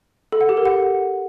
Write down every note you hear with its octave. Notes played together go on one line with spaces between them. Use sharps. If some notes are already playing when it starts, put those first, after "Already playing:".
A4
F#5
G4
A#4
F#5